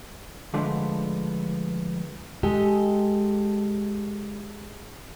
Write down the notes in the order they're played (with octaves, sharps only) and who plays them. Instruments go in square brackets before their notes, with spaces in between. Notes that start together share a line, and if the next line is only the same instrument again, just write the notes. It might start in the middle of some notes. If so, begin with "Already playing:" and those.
[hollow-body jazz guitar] D3 F3 G#3 A3 B3 D4
[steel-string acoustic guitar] G#3 G4 A4 D#5